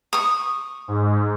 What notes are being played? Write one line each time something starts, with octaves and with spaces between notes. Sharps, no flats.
C#6 D#6
G#2